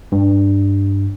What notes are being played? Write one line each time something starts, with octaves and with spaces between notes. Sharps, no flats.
G2